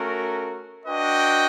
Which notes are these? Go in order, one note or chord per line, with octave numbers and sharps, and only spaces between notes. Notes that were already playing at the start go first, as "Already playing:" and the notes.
Already playing: A3 C#4 F#4 A#4
D4 F#4 B4 D#5 G5